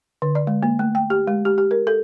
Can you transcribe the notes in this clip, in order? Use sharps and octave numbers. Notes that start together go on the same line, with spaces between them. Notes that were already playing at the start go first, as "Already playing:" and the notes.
D3
D5
G#3
A#3
A3
G5
G4
G#3
G4
G4
A#4
A4